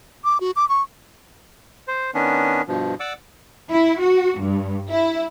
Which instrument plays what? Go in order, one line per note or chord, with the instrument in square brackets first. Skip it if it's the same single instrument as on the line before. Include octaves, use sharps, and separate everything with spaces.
[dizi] D6
F#4
D6
C#6
[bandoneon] C5
D#3 B3 C#4 D4
G2 B2 F3
D5 F#5 D6 E6
[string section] E4
F#4
G2
E4